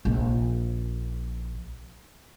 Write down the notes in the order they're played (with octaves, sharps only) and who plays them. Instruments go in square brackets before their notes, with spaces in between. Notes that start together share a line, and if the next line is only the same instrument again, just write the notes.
[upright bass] A#1 D#4